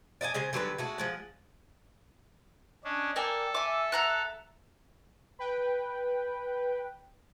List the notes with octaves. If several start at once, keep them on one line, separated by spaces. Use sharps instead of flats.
D5 D#5 F#5 G#5
C#3 G#3 C5 G#5
D3 F#3 G3 B4
G#3 A3 F#4
F3 G#3 F#5
C#4 D4 D#5
A#3 A4 D5 G5 G#5
E5 G#5 D6
F#5 A#5 F#6
B4 G5